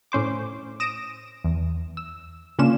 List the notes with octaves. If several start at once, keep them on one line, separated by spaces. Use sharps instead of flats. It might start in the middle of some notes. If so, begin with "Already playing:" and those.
A2 C#4 C5 D6
D#6 A#6 D7 E7
E2
E6
C#3 A#3 C#4 D4 F4 E7